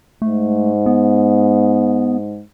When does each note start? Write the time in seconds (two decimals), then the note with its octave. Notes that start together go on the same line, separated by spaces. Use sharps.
0.22 G#2 A3
0.86 B3